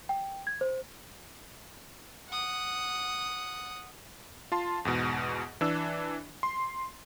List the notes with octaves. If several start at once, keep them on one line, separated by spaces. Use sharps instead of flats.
G5
G#6
C5
F#5 D#6
F4 A5 C6
E2 G#2 B2
E3 D4 E6
C6